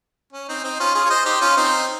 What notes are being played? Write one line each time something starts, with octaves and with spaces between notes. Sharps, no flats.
C#4
C4 D#4
C4 D#4
C#4 F4
F4 G#4
C#5
C5 D#5
D#4 G4
C#4 F4
C4 D#4